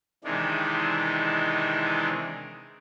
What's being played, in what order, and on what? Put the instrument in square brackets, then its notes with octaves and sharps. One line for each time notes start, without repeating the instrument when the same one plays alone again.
[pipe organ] C3 D#3 E3 G#3 D4